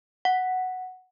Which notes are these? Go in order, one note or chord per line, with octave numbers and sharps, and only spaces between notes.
F#5